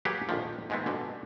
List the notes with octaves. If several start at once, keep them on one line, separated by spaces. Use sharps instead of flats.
F#3 A#3 G4 G#4 B4 F#5
A#1 F2 D3 D#3 F3
G#2 D#3 G#3 A3 B3 C4
G2 B2 D3